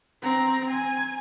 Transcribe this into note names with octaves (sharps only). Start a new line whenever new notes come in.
C4 A#5
G#5